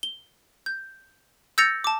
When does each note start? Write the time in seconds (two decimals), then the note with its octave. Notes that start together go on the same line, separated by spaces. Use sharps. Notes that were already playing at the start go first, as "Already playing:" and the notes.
0.03 G7
0.66 G6
1.58 E6 G6 A6 A#6 C#7 F7
1.84 A5 D6